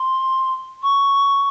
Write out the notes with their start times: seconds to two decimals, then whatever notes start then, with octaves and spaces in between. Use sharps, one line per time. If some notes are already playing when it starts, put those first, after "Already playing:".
Already playing: C6
0.83 C#6